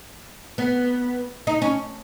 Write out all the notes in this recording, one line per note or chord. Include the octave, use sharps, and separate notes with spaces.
B3
D#4
C#4